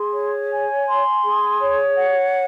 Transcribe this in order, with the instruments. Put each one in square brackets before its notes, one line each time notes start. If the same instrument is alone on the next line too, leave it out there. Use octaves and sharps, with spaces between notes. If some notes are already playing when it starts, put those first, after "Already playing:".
Already playing: [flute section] G#4 C6
C#5
G#5
C6
G#4
C#5
F#5